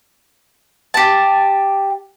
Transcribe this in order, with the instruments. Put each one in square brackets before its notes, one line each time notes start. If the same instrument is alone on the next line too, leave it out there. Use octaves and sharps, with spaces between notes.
[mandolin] G4 A5